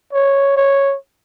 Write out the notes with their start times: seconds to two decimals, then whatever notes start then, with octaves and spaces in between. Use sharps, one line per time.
0.13 C#5
0.57 C#5